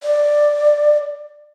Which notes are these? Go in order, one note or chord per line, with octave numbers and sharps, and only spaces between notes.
D5